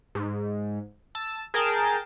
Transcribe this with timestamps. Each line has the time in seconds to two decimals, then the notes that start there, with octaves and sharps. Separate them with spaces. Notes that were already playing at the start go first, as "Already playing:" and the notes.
0.15 G#2
1.15 A5 E6
1.54 G#4 A#4 G5 A5